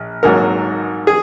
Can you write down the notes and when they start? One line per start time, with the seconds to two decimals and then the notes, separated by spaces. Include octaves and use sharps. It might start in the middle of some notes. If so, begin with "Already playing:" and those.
Already playing: A#1
0.23 G#1 G#2 F#3 A#3 A#4
1.07 G#4